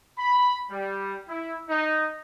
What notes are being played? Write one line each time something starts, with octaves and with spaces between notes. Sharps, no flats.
B5
G3
E4
D#4